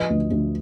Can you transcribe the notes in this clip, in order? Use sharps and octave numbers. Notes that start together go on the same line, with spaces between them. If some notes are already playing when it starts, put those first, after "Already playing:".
Already playing: F3 B4 D#5
D2
D2